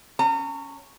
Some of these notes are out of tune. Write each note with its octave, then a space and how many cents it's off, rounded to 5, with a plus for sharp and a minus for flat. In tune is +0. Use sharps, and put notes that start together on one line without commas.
C#4 +0 A#5 -35